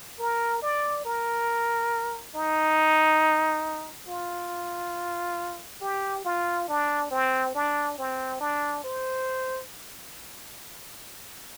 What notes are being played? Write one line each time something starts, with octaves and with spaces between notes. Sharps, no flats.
A#4
D5
A#4
D#4
F4
G4
F4
D4
C4
D4
C4
D4
C5